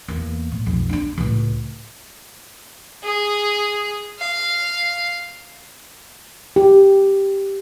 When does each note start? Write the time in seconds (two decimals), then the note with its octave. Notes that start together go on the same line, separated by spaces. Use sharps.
0.08 E2 A#3
0.52 A2
0.66 B1 F2
0.89 C#4 D4
1.18 C#2 A2
3.03 G#4
4.19 F5
6.56 G4